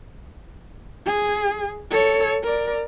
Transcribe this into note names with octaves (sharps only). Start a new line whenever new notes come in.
G#4
A4 C#5
A#4 D5